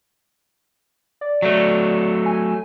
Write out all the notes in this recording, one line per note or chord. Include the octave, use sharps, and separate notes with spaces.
D5
F#3 A3
G#5